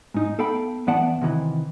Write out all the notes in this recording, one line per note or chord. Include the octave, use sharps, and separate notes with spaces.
G#2 D#4
B3 A4 F5 G5 B5
E2 E3 B3 D5 F#5 A5
C3 D#3 E3